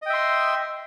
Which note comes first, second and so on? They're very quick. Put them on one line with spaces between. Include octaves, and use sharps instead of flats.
D#5 G5 E5 C6